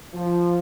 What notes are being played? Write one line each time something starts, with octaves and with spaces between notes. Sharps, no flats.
F3